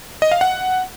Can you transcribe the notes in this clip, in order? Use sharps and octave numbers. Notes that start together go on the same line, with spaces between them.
D#5
F5
F#5